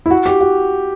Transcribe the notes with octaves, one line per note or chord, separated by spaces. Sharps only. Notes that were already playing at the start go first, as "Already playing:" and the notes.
E4
F#4
G4
F#4